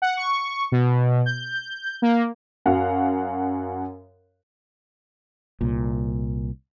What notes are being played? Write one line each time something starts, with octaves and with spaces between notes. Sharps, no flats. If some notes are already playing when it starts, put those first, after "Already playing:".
F#5
C#6
B2
G6
A#3
F#2 F#4 F5 F#5
C2 A#2